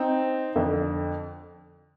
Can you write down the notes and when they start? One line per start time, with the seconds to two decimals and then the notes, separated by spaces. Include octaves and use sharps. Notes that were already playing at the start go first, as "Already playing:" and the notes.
Already playing: C4 D#4
0.56 F2 D3